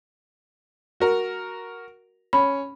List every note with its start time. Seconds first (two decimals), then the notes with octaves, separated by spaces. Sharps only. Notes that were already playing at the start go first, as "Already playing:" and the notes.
1.00 F#4 A#4
2.33 C#4 B5